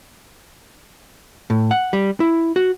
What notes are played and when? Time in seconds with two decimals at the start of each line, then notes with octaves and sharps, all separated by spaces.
1.50 A2
1.71 F#5
1.93 G3
2.20 E4
2.56 F#4